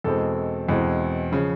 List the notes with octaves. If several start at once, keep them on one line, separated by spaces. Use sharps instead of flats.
E2 B2 G#3 C4 A4
E2 B2 G#3 C4
C#3 F3